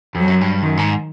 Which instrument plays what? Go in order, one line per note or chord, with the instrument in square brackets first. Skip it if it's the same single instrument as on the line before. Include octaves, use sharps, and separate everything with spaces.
[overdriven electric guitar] F2 [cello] F#3
[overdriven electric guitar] F#2
G2
[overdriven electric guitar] F#2 [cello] D#3
[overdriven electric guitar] G#2